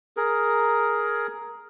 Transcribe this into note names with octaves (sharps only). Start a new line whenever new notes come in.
G#4 A#4